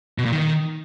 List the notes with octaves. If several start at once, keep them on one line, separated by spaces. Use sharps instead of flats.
B2
A#2
D#3